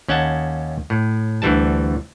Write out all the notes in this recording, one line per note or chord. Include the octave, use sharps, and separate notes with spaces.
D#2 C#4 F#5 G5 A5
A2
D2 D3 E3 G3 A5